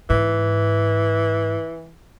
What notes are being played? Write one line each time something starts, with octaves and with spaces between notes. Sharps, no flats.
G#2 E3